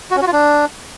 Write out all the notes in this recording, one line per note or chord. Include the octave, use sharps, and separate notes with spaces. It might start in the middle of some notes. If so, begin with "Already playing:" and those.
F#4
C#4
F#4
F4
D4